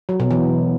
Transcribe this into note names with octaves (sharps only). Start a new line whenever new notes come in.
F#3
B2
E3